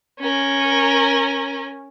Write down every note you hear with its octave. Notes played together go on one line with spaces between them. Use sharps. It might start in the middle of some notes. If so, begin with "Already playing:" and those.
C#4 A#4